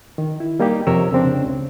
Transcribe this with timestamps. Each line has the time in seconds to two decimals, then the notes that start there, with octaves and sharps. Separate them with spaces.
0.18 D#3
0.40 E4
0.60 G3 A#3 D#4 G4
0.87 F2 C3 A#4 C#5 E6
1.12 C#3 C4 D4
1.44 C#2